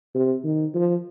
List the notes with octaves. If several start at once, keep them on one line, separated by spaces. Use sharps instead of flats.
C3
D#3
F3